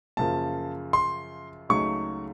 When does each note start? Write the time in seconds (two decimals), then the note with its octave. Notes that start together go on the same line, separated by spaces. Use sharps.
0.17 F#2 C#3 F3 A#3 F4 A5
0.93 C6
1.69 C#2 C#3 F#3 A3 D#4 C#6